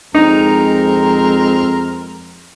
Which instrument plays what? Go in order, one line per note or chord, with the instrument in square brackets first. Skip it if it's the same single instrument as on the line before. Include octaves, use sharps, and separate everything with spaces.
[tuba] F2 [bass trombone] G#3 [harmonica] C4 A#4 A#5 [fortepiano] D#4